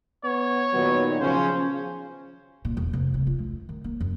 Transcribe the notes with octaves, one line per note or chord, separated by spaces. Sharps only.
B3 C#5
A#2 D#3 F#3 B3
C#3 F3 C#4 C5
A#2
E1
F1
C#3
F4
A3
D#3
A#3
F#2